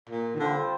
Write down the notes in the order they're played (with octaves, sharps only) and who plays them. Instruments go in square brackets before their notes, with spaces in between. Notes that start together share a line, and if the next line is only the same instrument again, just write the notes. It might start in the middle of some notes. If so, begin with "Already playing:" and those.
[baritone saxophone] A#2
D#3
[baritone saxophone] D3 [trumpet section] G3 C4 F4 C5 G5